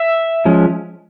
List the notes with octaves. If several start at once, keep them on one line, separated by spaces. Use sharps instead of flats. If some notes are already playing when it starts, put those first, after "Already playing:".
Already playing: E5
F3 G#3 C#4